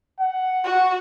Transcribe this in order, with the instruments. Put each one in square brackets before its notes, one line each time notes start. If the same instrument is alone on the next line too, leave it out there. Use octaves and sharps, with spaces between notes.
[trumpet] F#5
[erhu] F#4